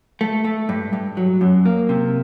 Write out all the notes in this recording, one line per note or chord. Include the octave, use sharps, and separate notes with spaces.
A3
A3
G2
G2
F#3
F#2
A#3
C3